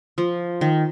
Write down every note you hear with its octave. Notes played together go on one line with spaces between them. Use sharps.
F3
D#3